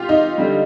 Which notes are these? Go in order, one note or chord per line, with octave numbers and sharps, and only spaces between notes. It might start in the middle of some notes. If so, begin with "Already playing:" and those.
Already playing: F4 G4
D#4
D3 G3